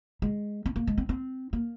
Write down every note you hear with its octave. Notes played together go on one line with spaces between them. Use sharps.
G#3
C4
A#3
G#3
C4
C4
A#3